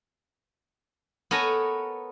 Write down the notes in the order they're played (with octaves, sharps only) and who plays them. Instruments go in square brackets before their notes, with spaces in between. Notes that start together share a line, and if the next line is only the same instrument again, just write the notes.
[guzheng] B3 A4 A#4 C#5 G#5 A#5